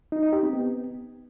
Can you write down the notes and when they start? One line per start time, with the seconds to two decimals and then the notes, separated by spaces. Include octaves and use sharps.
0.12 D#4
0.22 D#4
0.33 G4
0.43 C4
0.53 B3